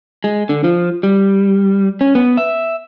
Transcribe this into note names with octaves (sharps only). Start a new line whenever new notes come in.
G#3
D3
F3
G3
C#4
B3
E5